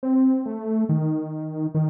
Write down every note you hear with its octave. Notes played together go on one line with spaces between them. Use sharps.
C4
A3
D#3
D#3